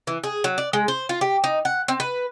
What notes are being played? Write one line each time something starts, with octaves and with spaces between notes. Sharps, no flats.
E3
G#4
F#3
D5
G#3
C5
F4
G4
D#4
F#5
C4
B4